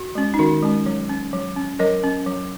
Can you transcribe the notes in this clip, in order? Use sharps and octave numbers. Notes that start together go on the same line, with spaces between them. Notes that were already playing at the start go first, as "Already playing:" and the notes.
Already playing: F#4
G#3 C#4
D#4
D#3 F#4
G#3 C#4
F#3
C#4
F#3
C#4
F#3 A#4 D#5
C#4
F#3